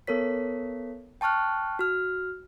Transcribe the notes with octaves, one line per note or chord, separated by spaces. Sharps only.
B3 A4 A#4 C#5 B6
G5 A5 C#6 F6 F#6
F#4 F6